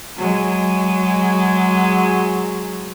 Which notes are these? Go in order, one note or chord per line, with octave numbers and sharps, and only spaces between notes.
F#3 G#3